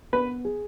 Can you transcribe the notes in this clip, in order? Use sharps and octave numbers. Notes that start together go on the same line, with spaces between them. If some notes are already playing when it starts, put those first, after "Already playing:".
B3 B4
G#4